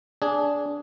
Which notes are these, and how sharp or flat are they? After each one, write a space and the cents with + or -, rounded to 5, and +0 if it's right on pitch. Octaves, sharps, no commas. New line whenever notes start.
D4 -15 G#4 +0